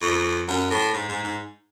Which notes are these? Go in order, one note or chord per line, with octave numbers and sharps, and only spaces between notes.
F2
F#2
A2
G#2
G#2
G#2